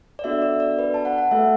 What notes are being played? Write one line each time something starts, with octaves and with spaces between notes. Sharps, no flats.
D5
B3 D4 F#4 A4 E5
D5
D5
B4
A5
F#5
F#5
A3 F#4 A4 E5